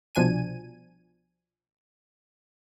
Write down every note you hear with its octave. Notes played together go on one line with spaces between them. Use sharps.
C2 B2 F3 D4 G#5 D#7